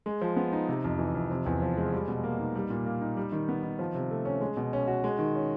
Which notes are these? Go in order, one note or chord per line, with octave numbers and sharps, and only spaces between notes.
G#3
F3
B3
D#4
C3
F2
E3
F2
C3
E2
F3
G#3
G3
B2
A#3
D#4
G3
A#2
A#3
D#4
G3
D#3
B3
D#3
F3
C3
A3
C#4
G#3
B2
C#4
F#4
G#3
D#3
C#4